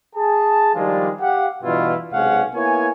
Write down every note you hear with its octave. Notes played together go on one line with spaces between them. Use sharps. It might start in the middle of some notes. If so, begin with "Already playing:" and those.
G#4 A5
D#3 F3 G3 G#3 D4 F4
G4 F5 F#5
G2 B2 E3 E4 F4
B1 C3 G#3 C#4 F5 F#5
A#3 B3 E4 C#5 G#5